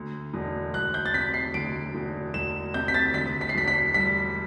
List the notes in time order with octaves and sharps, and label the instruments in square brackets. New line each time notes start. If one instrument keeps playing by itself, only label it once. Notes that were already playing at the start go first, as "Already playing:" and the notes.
Already playing: [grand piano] D2
E1
E1 F#6
G6
A6
C3 B6
C7
D2 D7
E1
E1 E7
C3 G6
B6
A6
D2 B6
B6
C7
E1 B6
B6
G3 B6